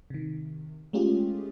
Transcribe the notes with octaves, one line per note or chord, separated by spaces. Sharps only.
C3 D#3
G#3 A3 C#4 F4 G4 G#4